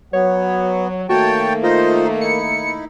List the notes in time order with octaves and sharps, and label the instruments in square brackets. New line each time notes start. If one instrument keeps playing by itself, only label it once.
[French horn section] F#3 [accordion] B3 [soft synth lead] C#5
[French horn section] D#3 A3 A#3 [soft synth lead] F#4 [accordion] C#5 G5 A5
[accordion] D#4 C5 D#5 [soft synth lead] F4
[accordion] D#4 E4 [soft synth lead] C#7